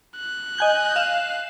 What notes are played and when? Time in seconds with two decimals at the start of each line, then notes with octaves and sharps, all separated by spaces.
0.17 F#6
0.58 D#5 G#5 G6
0.96 F5 E7